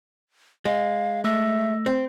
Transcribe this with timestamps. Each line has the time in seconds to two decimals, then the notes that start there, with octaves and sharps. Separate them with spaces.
0.65 G#3 F5
1.24 A3 E5 E6 A#6
1.86 C4